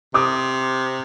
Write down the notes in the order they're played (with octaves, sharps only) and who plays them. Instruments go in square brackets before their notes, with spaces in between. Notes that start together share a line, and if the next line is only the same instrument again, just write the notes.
[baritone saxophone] C3 [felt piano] D6 D#6